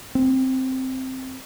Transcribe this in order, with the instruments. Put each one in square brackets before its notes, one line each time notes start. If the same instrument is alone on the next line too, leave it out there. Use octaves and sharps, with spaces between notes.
[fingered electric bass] C4